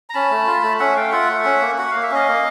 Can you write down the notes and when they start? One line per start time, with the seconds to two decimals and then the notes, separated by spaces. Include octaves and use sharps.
0.10 A#5
0.14 C#4 A5 B5
0.31 A3
0.46 F4
0.63 A3
0.80 C#4 E5 F#5
0.96 A3 F5 G5
1.12 F4 E5 F#5
1.29 A3
1.45 C#4
1.61 A#3
1.78 F#4 F#5
1.91 A#3 F5
2.02 E5
2.11 C#4 D#5 F5
2.28 A#3